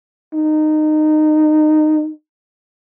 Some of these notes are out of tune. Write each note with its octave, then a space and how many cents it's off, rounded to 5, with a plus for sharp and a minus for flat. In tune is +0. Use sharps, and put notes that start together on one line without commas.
D#4 -20